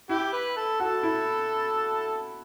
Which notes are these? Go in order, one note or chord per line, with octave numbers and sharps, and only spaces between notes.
E4 G4
B4
A4
F#4 A4
E4